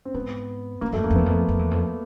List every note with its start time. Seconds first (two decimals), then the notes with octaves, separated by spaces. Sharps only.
0.05 C4
0.14 G#2 B3
0.81 G2 A#3
0.93 F#2 A3
1.04 F#2 A#3
1.10 F2
1.16 E2 B3
1.26 F2
1.49 F2
1.59 E2
1.71 F2